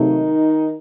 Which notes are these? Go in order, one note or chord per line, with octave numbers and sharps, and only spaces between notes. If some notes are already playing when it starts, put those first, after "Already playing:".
Already playing: C3 D#3 F#3 A3 D#4